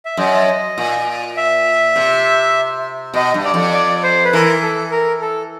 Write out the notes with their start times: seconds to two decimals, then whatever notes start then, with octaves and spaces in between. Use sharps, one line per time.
0.05 E5
0.17 F#2 D#5
0.78 A#2
1.37 E5
1.96 C3
3.14 B2 D#5
3.34 G2
3.44 D5
3.54 F2
3.73 D5
4.03 C5
4.25 B4
4.33 E3 A#4
4.63 A4
4.92 A#4
5.22 A4